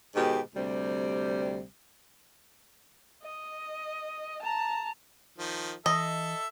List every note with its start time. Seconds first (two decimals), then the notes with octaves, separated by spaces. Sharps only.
0.16 G#2 B2 D#3 G4
0.55 D2 C3 G3
3.22 D#5
4.42 A5 A#5
5.38 D#3 F3
5.86 E3 A4 D#5 E5